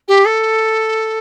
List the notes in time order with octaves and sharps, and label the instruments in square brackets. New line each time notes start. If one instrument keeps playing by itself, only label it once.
[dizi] G4
A4